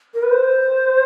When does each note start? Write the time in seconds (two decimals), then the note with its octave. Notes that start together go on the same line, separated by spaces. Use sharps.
0.14 A#4
0.22 B4
0.31 C5